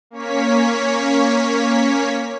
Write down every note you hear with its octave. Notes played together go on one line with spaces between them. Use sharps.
A#3 C#4 C#5 B6